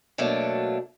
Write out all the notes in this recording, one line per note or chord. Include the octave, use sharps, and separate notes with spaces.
B2 F#3 A3 A#3 D4